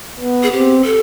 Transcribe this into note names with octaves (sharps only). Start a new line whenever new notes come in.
B3
G#4
C4 G4
A4